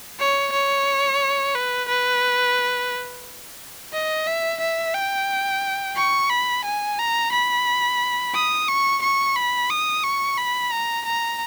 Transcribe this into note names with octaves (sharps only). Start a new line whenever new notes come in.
C#5
C#5
B4
B4
D#5
E5
E5
G5
C#6
B5
G#5
A#5
B5
D#6
C#6
C#6
B5
D#6
C#6
B5
A#5
A#5